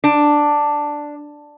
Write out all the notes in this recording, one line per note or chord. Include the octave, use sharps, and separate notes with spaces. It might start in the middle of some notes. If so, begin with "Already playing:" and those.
D4